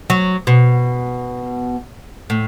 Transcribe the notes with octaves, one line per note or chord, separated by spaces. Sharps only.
F#3
B2
A2